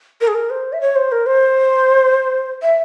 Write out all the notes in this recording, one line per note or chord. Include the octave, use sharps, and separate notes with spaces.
A#4
G#4
A#4
C5
E5
C#5
C5
A#4
C5
E5